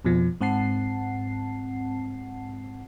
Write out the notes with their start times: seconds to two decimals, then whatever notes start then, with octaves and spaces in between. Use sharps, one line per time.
0.05 F2 B2 F3
0.41 G#2 C4 F#5 A5 C7